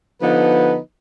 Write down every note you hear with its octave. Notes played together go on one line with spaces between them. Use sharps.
D3 F3 B3 D#4 B4